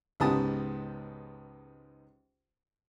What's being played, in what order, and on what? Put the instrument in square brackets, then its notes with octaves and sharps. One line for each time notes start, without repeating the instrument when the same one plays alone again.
[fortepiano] C#2 G#2 B3 G4 A5 D#6